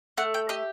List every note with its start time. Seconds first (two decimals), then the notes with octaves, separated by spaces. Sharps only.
0.18 A3 F#5
0.34 G5
0.49 G4 D#5